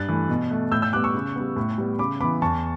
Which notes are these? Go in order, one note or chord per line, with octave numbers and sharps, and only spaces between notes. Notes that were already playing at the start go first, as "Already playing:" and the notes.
Already playing: G2 F#6 A6
E3 A3
B2
A3
A2 E6 G6
E6 G6
G3 B3 D6 F#6
C#6 E6
C#3
G3 B3
A2
G3 B3
C#3 B5 D6
E3 B3 B5 D6
E2 A5 C#6